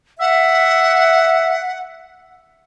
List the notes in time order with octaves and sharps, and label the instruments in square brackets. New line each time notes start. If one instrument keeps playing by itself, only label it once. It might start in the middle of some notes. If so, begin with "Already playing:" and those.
[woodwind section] E5 [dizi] F#5